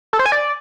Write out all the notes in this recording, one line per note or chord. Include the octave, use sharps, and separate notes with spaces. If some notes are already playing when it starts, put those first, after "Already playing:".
A4
C5
G#5
D5